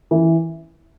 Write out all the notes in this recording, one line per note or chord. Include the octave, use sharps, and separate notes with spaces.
E3